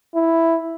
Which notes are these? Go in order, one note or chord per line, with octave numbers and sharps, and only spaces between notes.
E4